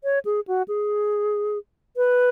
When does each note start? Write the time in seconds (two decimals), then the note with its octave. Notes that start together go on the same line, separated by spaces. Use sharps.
0.04 C#5
0.25 G#4
0.48 F#4
0.68 G#4
1.97 B4